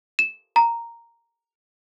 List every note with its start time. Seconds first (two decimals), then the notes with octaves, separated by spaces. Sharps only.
0.19 E7
0.56 A#5